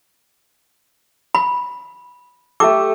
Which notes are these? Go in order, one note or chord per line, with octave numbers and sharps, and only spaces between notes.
B5
A3 G4 A4 D6